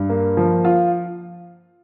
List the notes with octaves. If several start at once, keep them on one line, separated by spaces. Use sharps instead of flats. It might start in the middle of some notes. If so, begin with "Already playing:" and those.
Already playing: G2
A#3
F3
F4